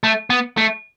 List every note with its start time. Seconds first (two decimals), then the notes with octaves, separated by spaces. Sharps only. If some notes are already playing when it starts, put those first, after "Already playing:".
0.04 A3
0.30 B3
0.57 A3